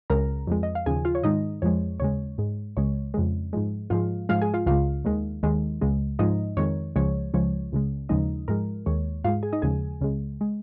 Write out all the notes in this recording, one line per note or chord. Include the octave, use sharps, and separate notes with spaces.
C#2 C#3 G#3 A#4 A#5
F2 F3 G#3
D#5
F5
D#2 C#3 F3 G#4 G#5
F4 F5
C#5
G#2 D#3 G#3 D#4 D#5
F2 F3 G#3 C#5
D#2 C#3 G#3 C#5
G#2 G#3
C#2 C#3 G#3 C#5
F2 C#3 G#3
G#2 F3 G#3
G#2 F3 G#3 F4 F5
G#2 F3 G#3 F4 F5
G#4 G#5
F4 F5
C#2 C#3 G#3 F4 F5
D#2 D#3 G#3
D#2 D#3 G#3
C#2 C#3 G#3
G#2 F3 G#3 D#4 D#5
F2 D#3 G#3 C#5
C#2 C#3 F3 G#3 C#5
C#2 C#3 F3 G#3 C#5
C#2 C#3 G#3
D#2 C#3 F3 G#3 D#4 D#5
G#2 F3 G#3 A#4
D#2 D#3 G#3 C#5
G#2 G#3 F4 F5
G#4 G#5
D#4 D#5
D#2 C#3 F3 G#3 G#4 G#5
C#2 C#3 G#3
G#3